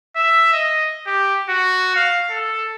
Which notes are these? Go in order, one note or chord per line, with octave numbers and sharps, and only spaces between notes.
E5
D#5
G4
F#4
F5
A4